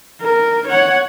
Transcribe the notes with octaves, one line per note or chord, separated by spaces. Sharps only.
A#4
C#5 F#5